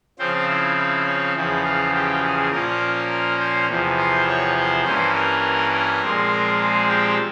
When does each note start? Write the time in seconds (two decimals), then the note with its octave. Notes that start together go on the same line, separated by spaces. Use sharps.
0.19 C#3 F3 C4 C5
0.48 E4
0.77 E4
1.06 C#4
1.35 E2 C#3 F3 E4
1.64 F4
1.94 G4
2.23 G#4
2.52 A#2 F3 A#3 C#4 A#4
3.10 A#4
3.39 C5
3.68 E2 C3 F3
3.98 C5
4.27 C#5
4.56 C5
4.85 G2 E3 A#3 C#4 C5
5.14 A#4
5.72 A#4
6.02 A#2 F3 G#3 C4
6.59 G#4
6.89 G4